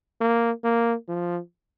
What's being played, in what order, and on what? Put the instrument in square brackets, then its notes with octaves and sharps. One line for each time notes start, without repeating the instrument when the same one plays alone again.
[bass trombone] A#3
A#3
F3